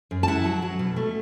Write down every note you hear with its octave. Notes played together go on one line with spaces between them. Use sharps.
F#2
A5
E4 F#5
F#3
F#3
B2
A3